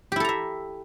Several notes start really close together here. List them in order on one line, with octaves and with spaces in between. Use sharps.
G4 E4 A4 A#5 E5